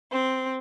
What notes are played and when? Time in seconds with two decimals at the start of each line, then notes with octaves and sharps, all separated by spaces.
0.12 C4